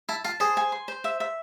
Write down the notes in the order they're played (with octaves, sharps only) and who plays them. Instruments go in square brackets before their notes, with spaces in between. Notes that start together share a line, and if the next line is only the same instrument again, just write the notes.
[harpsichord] E4 [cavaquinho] A5
[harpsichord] F4 [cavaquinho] A5
[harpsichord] G#4 [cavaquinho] C5
[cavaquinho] G#5
C6
C5
E5
E5